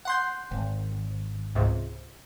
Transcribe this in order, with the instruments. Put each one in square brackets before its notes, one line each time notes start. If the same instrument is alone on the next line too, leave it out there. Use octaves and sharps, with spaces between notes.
[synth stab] F#5 C6 G6
[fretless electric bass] G#1
[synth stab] C#2 G#2 C3